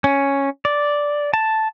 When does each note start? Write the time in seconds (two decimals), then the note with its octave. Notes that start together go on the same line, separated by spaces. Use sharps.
0.04 C#4
0.65 D5
1.34 A5